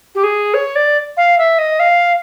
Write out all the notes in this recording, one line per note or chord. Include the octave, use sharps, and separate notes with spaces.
G4
G#4
C#5
D5
F5
E5
D#5
F5